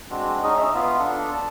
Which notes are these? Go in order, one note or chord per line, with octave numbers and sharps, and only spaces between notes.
G#3 C4 D4 F#4
C#4 D#4 G#4 D#5
E5 A#5
B3 F4
D4 A4
A5